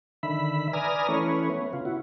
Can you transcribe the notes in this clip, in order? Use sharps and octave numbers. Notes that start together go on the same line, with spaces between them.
D3 D#3 E5 B5
B4 D5 G#5 A#5 D#6 F6
E3 A3 C#4 B4 C#5
B3
C#3 F4
E4 F#4